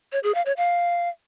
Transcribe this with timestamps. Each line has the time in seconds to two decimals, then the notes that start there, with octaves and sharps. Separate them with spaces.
0.12 C#5
0.23 G#4
0.35 F5
0.46 C#5
0.57 F5